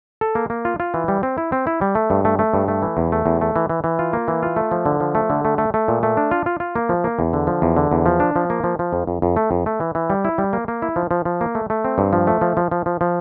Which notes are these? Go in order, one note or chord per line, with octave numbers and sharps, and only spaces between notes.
A4
A#3
A#3
F4
F4
E3
G3
C4
E4
C4
E4
G3
A3
G2
A3
A3
G2
A3
E3
E2
A3
E2
A3
E3
E3
E3
F4
A#3
E3
F4
A3
F3
D3
F3
A3
D3
A3
A3
A3
A#2
A3
D4
F4
F4
F4
A#3
F3
A#3
E2
D3
F3
E2
D3
E2
F3
D4
F3
A#3
F3
F3
F2
F2
F2
A3
F2
A3
E3
E3
G3
E4
G3
A#3
A#3
E4
F3
F3
F3
A#3
A3
A3
C4
G2
F3
A3
F3
F3
F3
F3
F3